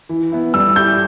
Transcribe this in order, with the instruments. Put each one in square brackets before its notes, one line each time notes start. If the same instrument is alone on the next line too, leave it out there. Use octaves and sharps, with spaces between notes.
[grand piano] E3
B3 E4
[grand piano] G3 [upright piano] E6
[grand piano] E4 G4 [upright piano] G6